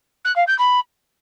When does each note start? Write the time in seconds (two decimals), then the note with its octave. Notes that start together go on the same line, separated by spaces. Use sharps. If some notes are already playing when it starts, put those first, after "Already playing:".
0.25 F#6
0.36 F5
0.47 G6
0.59 B5